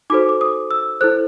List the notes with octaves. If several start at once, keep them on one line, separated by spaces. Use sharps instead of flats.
D#4 F#4 A4 C5 D6
D6
D#6
E6
E4 A4 C5 F#6